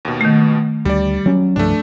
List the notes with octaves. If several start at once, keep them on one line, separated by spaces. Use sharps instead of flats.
D#2 B2
D#3 A3
D2 G3 D5
F#3 C#4
C2 G2 F3 A3 D4